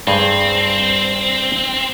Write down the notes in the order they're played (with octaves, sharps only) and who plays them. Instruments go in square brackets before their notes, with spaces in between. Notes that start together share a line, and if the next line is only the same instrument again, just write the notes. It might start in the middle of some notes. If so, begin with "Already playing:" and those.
[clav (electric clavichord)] G2 G#4 C5 [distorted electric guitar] C4